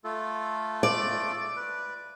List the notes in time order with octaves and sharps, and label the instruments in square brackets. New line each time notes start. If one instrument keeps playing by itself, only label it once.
[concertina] A3 F4 A4
[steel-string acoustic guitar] D5
[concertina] B4